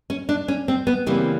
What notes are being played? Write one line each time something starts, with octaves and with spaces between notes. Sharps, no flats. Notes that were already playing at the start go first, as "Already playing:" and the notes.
C#4
D4
C#4
C4
B3
C#3 E3 G3 A#3 C4